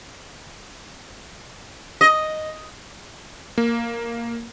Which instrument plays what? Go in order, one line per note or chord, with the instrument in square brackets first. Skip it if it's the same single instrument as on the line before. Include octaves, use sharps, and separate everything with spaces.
[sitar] D#5
[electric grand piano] A#3